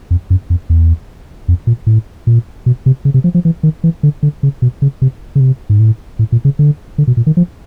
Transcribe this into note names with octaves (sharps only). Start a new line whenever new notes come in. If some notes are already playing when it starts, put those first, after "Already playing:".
F2
F#2
F2
E2
F2
A#2
A2
A#2
B2
C3
C#3
C3
F3
F3
E3
D#3
E3
D3
D3
C#3
B2
C#3
C3
C#3
C3
G#2
A2
A2
A#2
C#3
D3
D3
B2
A#2
D#3
F3